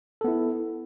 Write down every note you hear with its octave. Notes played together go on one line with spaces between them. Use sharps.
B3 E4 A4